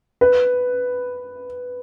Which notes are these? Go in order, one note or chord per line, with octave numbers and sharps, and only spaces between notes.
B4